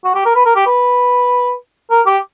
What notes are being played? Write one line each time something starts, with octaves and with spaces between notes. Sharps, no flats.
F#4
G4
A#4
B4
A#4
G4
B4
A#4
G4